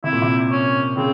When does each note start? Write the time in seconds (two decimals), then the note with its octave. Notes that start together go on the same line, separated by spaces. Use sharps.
0.04 C3 E4
0.13 A#2
0.22 C3
0.51 C#4
0.97 C#3 C4